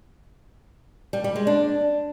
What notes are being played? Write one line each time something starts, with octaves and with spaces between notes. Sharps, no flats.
G3
G3
G#3
D4